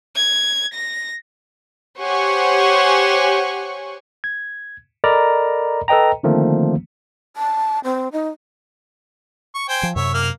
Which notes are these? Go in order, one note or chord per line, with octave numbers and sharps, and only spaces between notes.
G#6
A#6
G4 C5 C#5 F#5 G#5 C#6
G#6
A4 A#4 D5 D#5 A#5 B5
A4 B4 D#5 G5 A#5
D3 D#3 F3 A3 A#3 C4
A5
C4
D#4
C#6
C5 G5 G#5
F3
F#2 C3 C#5 E5
A#3 F6